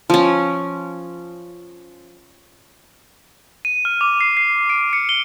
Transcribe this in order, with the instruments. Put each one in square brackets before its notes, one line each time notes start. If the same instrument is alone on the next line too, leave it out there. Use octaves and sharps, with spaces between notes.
[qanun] F3 C#4
[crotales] D#7
F6
D6
C7
C7
D7
C#7
G7